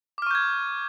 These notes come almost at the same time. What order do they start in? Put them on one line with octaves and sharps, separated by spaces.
D6 F6 C#6 G6 G#6